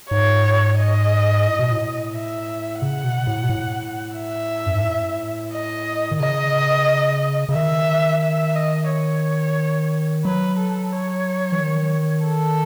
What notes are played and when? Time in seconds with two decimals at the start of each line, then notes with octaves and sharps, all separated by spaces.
0.11 G#2 C#5
0.79 D#5
1.46 A2
1.59 B2
1.72 A2
2.14 E5
2.82 C#3 F#5
3.04 B2
3.27 A2
3.43 B2
3.50 A2
4.17 E5
4.66 F#2
4.75 G#2
4.84 A2
5.52 D#5
6.11 D#3
6.19 C#3 D#5
7.49 C#3
7.54 D#3 E5
8.22 E5
8.55 D#5
8.89 C#5
10.24 F#3 B4
10.59 A4
10.93 C#5
11.52 E3
11.60 D#3
12.27 A4